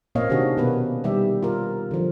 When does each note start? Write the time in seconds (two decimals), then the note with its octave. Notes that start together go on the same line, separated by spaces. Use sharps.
0.15 A#2 A#3 C4 C#5 D#5 F5
0.29 C3 D#3 C#4 D4 F#4 G#4
0.57 B2 A#3 B3 B4
1.04 D#3 G3 G4 E5
1.43 F4 A#4
1.91 D3 F3